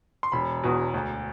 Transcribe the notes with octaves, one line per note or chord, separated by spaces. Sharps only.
C6
E1 B5
E2 B2
D2